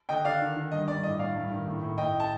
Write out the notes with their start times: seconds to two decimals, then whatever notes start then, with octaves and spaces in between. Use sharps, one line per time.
0.09 D3 D#5 G5
0.25 D3 D5 F5
0.41 D#3
0.56 D#3
0.72 G2 D#5
0.88 G2 D5
1.03 A2 D#5
1.19 A2 D5 F5
1.36 G2
1.51 D#3
1.67 A2
1.82 A2
1.98 A2 D#5 G5
2.14 A2
2.20 A5